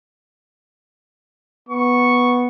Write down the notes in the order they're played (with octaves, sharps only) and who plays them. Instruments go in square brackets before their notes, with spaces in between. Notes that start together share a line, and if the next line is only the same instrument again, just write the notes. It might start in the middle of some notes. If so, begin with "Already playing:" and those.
[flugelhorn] B3 [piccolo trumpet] C#6